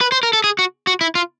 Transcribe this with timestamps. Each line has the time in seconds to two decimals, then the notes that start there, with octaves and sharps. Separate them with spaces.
0.01 B4
0.12 C5
0.23 A#4
0.33 A4
0.44 G#4
0.59 F#4
0.87 F#4
1.01 E4
1.15 F4